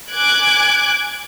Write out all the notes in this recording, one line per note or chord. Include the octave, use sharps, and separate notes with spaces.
G#5 D6 F#6 G#6 D7